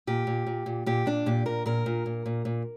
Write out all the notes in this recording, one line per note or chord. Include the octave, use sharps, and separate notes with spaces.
A#2 G4
A#2
A#2
A#2
A#2 G4
A#2 D4
A#2 G4
A#2 A#4
A#2 A#4
A#2
A#2
A#2
A#2